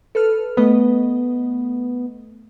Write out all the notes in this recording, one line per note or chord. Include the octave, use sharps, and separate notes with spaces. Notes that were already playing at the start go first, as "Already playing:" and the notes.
A4 B4 F6
A3 B3 B4 D#5